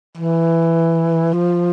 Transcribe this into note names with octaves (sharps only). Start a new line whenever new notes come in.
E3
F3